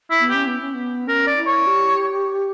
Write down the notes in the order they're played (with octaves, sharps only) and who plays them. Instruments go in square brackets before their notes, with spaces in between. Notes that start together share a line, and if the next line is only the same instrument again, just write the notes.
[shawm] E4
[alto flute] B3
[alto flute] C#4 [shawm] G4
[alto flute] B3
C#4
B3
[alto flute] C#4 [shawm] A#4
[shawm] D5
[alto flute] E4
[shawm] C#5
[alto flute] G4